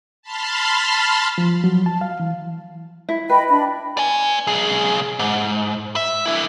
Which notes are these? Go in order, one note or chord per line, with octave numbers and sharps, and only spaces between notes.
A5 B5 C6 F6
F3
F#3
A5
F5
E3
E4
B4 D#5 G5 B5
D4 B5
D5 G#5
B1 G#4
G#2
E5
D3 E4